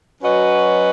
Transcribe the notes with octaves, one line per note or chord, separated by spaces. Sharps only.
F#3 C#4 F#4 B4 D#5